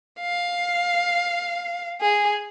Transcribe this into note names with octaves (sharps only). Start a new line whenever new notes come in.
F5
G#4